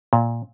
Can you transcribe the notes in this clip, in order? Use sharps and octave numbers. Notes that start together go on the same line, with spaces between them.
A#2